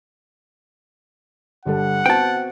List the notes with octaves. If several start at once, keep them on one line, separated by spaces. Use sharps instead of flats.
G1 G3 A4 F#5
B3 C4 F#4 G5 A5